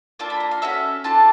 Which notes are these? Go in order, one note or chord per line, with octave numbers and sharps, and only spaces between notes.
A#3 D4 F4 A4 A5
B5
A#5
F5
C#4 F#4 A4 E5
D4 F4 A4 A5